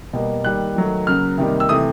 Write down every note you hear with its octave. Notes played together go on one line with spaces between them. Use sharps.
B2 G3 A#3
D#3 G3 A#3 F#6
D#3 F#3 A3
C#3 F#3 A#3 F6
C3 D#3 G3 A#3
E6
C3 E3 A3 D#6